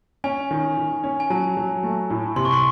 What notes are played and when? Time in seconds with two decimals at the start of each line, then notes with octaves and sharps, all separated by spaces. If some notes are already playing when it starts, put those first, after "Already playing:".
0.24 C#4 G#5
0.51 D#3
0.77 D#3
1.04 C#4
1.20 G#5
1.30 F#3 A5
1.57 F#3
1.83 A3
2.10 A2
2.36 C3 C6
2.45 C#6
2.53 C6